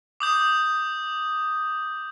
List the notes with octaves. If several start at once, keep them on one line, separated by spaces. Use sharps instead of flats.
D6 D#6 G6